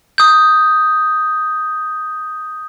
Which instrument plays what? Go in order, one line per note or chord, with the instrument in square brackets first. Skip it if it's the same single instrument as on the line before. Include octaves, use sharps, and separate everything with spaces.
[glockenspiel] D#6 G6